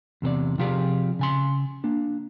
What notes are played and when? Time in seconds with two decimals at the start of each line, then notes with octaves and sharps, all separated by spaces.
0.22 E2 C3 A4 D5
0.58 C3 F3 F4 G4 G#4 D5
1.19 C#3 G#5 C6
1.84 A#3 D4